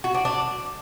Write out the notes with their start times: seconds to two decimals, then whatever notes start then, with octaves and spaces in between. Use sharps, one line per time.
0.04 F#4
0.14 D4
0.25 D4